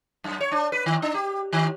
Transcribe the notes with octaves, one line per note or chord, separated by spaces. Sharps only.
F#2
C#5
D4
B4
D#3
D4
G4
D#3